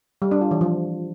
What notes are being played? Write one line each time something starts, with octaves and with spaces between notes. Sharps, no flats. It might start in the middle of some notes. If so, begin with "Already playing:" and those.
G3
D4
F4
E3
F3